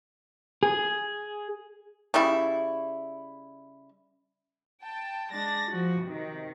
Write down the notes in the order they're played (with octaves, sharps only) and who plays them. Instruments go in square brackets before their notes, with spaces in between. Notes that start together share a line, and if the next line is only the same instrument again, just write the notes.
[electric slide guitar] G#4
[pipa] C#3 G3 E4
[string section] G5 A5
G#3 D4 A6 A#6
F3 F#4
C3 D#3